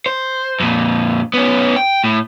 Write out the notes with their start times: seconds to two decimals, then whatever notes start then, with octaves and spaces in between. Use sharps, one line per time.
0.06 C5
0.60 F2 A#2
1.34 B3 C#4
1.76 G5
2.04 A2